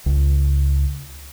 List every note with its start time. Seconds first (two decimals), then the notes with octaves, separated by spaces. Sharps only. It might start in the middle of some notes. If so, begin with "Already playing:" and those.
0.06 C#2